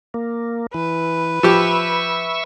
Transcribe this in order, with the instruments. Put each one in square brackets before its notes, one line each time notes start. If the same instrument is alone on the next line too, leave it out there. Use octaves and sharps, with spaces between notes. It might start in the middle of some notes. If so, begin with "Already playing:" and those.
[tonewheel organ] A#3
[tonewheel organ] E3 [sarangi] B4
[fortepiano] F3 G4 [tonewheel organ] E5 C#6 E6